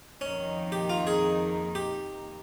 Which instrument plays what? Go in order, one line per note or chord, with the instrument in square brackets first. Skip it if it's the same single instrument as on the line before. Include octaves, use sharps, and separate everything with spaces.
[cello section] F2 D#3 A#3 D#4 [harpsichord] C#4
[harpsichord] G4
F4
G#4
G4